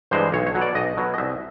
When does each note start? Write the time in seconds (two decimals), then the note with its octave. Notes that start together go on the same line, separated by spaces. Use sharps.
0.11 G2 E3 G#3 C5
0.32 B1 C#5
0.47 C#5
0.55 B2 F#3
0.61 D5
0.75 B1 D#5
0.97 B2 F#3
1.14 D#5
1.18 C2 E5